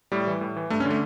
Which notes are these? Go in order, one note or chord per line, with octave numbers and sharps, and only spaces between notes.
A2 G3
E3
A2
E3
G2 A3
C#4
D3
A3